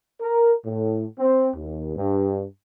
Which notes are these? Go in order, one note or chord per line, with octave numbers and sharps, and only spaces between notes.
A#4
A2
C4
D#2
G2